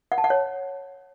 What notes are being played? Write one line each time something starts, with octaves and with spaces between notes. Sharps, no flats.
F#5
A5
F#5
C#5